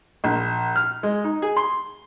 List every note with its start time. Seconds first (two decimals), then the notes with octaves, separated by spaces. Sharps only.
0.24 A#1
0.76 F6
1.03 G#3
1.24 D#4
1.42 G#4
1.56 C6